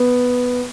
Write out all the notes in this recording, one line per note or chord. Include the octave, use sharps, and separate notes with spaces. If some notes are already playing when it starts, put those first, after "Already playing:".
Already playing: B3